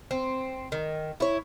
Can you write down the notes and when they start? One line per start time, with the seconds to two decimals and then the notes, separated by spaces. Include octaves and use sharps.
0.11 C4
0.72 D#3
1.20 E4 C#5